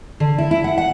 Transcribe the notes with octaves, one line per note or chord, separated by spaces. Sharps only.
D3
E4
E4
F#5
F#5